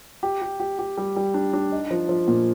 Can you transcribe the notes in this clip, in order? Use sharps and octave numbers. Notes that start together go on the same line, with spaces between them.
G4
G4
G4
G4
G3
G3
D4
D4
D#4
F3
F3
A#2